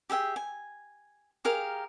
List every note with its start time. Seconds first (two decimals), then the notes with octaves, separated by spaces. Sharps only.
0.10 G4 G#4 E5 G5
0.36 G#5
1.45 G4 G#4 A#4 F5